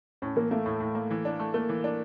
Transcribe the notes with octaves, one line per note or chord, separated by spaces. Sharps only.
A2 C#4
E3 A#3
A3 A#3
A2
A2
A#3
E3
D4
A3
A3 A#3
E3
D4